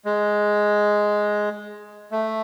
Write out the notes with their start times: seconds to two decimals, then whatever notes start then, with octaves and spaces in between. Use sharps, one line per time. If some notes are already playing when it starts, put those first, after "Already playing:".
0.05 G#3
2.11 A3